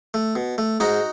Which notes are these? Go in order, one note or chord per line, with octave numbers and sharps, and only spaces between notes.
A3
B2
A3
G#2 D#4 F#4